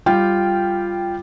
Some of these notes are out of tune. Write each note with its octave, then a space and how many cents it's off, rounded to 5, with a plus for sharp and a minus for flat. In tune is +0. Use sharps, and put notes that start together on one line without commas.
G3 +5 F4 -10 G5 +0